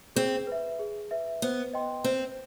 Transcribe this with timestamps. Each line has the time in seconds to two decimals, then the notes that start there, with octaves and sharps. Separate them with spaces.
0.16 C4 G#4
0.47 B4 E5
0.79 G#4
1.11 B4 E5
1.42 B3 C5
1.73 D#5 G5 C6
2.04 C4 C5